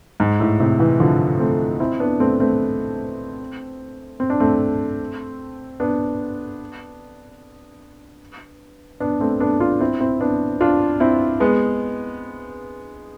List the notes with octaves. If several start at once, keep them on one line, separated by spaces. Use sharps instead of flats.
G#2
A2
A2 C3
C3 E3
D3 F3
A3 C4
C4 E4
B3 D4
A3 C4
A3 C4
C4
D4
A3 C4
B3 D4
B3 D4
A3 C4
B3 D4
D4 F4
C4 E4
C4 E4
B3 D4
D4 F4
C4 E4
G#3 B3